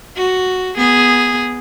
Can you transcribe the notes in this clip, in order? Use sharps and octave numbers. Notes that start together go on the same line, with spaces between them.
F#4
B3 G#4